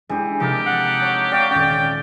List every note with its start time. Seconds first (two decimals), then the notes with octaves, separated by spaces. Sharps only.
0.09 E3 G#3 D4 G4
0.40 C3 F3 D#4 G4 A4 A#4
0.66 F#5
1.00 C#5 A5 E6
1.32 C#5 D5 F5 G5
1.51 D#1 C#4 D5 G5